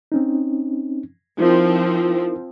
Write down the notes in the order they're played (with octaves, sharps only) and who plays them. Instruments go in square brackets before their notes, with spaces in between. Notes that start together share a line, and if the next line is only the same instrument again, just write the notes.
[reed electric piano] C4 C#4 D#4
[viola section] F3 C4 [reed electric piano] D#4 E4 A#4